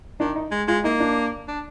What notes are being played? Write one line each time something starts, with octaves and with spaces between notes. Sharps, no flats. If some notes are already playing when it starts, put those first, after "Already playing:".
D#3 D4
D#4
G#3
G#3 F4
A#3 D#4
D4
D4